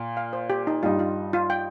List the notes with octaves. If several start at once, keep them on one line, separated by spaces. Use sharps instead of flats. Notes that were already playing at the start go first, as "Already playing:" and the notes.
Already playing: A#2
F5
C5
G4
D#4
G2 G3 D#4 F4
F4
F4
G5